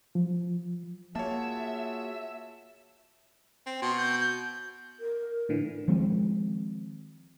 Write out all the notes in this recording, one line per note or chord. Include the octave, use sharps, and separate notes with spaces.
F3
A#3 F4 F#4 G#4 C#5 E5 A5
C4
B2 C6
G6
G6
A#4
A2 D3 E3
D#3 F3 G#3 C4